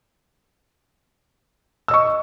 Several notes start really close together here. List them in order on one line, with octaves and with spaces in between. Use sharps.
E6 D#5 C#6